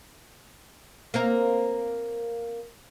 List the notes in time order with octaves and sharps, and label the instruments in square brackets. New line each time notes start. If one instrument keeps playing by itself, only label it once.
[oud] A#3 C4 A#4